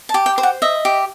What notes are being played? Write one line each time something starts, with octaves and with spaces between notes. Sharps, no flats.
A5
G4
G5
C5
F#5
D#5 E5
G4